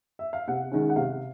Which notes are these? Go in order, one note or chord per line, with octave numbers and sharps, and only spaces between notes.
E5
F5
C3 F#5
D#3 G#3 C#4
F#5
C3 F5